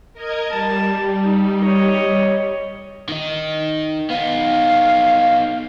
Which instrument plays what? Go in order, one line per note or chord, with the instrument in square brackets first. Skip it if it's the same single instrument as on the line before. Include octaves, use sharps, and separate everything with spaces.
[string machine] A#4 D#5 G#6
[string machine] G3 [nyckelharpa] A5
[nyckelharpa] D#4
C#5 D#5
[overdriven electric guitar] D#3 D#4
[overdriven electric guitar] B3 D#4 [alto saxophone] F5